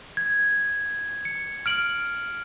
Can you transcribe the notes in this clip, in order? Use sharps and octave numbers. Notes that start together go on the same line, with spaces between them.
G#6
C#7
F6 D7 F#7